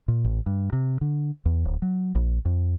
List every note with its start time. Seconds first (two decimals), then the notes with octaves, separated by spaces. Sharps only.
0.08 A#2
0.24 A1
0.46 G2
0.73 C3
1.01 D3
1.45 E2
1.65 D1
1.82 F#3
2.15 A#1
2.45 F2